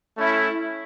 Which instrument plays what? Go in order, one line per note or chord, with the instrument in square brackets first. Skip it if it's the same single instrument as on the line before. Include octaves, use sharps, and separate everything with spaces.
[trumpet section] A3 C#4 E4